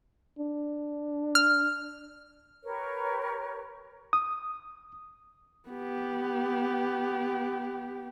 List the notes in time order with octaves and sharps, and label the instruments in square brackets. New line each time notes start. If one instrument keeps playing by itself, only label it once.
[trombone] D4
[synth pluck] F6
[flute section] G4 A#4 B4 C#5
[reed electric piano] D#6
[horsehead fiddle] B3 G4